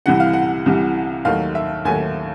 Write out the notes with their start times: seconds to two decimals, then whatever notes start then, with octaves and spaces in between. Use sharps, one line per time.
0.06 C2 C3 E3 G3 F#5
0.20 F5
0.33 F#5
0.66 C2 C3 E3 G3
1.25 D#2 D#3 F#3 A3 F5
1.55 E5
1.85 D#2 D#3 F#3 A3 G#5